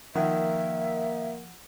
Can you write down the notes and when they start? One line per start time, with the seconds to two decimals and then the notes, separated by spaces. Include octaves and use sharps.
0.15 D#3 F3 A#3 E5 F#5